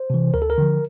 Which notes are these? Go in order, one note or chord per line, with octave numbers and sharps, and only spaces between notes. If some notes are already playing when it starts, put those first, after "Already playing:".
Already playing: C5
C3 E3
D2 A#4
A4
A#4
D3 F3